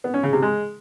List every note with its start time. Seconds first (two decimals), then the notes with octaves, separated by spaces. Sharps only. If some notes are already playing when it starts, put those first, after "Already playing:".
0.04 B3
0.14 C#4
0.23 C#3
0.33 C3
0.42 G#3